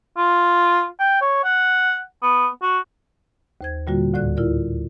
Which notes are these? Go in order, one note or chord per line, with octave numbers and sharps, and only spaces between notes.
F4
G5
C#5
F#5
B3
F#4
D#2 C5 G#6
A#2 D3 G3 A#3 F4 F#4
D2 A2 D5 F#6
E4 F4 A#4 D5